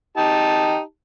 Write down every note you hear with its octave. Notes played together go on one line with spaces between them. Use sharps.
D#4 G4 A5